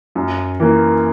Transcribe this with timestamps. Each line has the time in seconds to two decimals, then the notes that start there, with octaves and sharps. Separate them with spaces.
0.15 F#2
0.60 E3 A#3